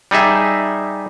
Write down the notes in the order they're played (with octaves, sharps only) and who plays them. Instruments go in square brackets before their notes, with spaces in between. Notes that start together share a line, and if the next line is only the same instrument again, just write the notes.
[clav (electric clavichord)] G3 D#4 G#4 E5